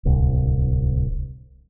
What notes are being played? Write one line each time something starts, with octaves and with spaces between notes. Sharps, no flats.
D1 C2